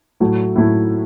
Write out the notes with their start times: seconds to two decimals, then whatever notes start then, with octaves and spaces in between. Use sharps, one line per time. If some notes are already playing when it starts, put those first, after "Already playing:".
0.20 A2 F#3 A3 E4
0.56 A2 F#3 A3 E4